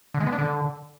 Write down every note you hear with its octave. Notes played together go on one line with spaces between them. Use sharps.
D3
G#3
B3
D4
D3